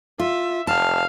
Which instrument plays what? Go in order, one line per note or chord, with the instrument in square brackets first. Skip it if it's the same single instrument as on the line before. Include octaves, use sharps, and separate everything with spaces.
[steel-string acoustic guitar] F4 [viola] E5
[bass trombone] F1 [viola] F5 [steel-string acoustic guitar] A5